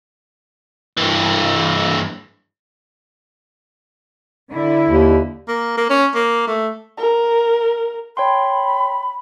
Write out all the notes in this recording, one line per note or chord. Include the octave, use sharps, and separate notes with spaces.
G2 E3
D3 E4
D#2
A#3
A#3
C#4
A#3
A3
A#4
C#5 G5 B5 C6